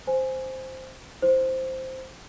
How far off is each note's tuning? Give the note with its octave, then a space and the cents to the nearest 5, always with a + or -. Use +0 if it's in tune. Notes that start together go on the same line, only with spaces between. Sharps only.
C5 +0 G#5 +0
E4 +0 C5 +0